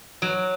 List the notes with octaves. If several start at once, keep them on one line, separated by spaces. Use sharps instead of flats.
F#3